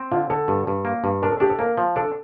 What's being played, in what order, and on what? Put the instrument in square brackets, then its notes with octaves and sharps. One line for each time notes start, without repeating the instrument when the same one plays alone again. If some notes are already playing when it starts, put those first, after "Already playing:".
Already playing: [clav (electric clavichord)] C4
[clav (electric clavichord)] D3 [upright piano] F4
[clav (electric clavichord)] D3 [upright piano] A4
[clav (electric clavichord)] G2
G2
A#3
G2
[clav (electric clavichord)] D4 [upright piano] A#4
[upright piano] A4
[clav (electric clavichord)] D4 [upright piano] G4
[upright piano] A4
[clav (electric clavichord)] A#3 [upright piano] A#4
[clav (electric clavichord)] F3
[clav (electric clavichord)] D4 [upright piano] A4